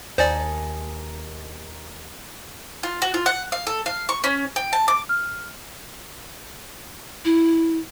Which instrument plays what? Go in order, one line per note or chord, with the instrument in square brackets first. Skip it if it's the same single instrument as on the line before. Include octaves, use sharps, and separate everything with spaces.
[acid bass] D#2 [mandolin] D#4 G#5 A5 [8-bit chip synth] C5 D5
[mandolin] F4
F#4
F4
F#5
F5
A4
F5
C#6
C#4
G5
A5
D6
[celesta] F6
[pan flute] E4